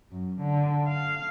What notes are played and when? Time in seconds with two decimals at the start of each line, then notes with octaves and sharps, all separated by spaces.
0.12 F#2
0.41 D3
0.88 F5